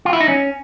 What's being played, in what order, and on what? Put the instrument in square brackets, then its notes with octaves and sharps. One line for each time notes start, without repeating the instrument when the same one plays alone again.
[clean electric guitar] F4
E4
D#4
C#4